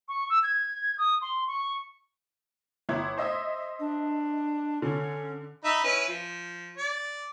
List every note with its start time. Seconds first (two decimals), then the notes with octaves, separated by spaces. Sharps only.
0.08 C#6
0.30 E6
0.43 G#6
0.98 D#6
1.22 C6
1.48 C#6
2.89 G1 E4 G#6
3.18 C5 D#5 E5
3.80 D4
4.82 D3 C#4
5.65 D#4 E5 B5
5.84 C#4 E4 B4
6.08 F3
6.78 D5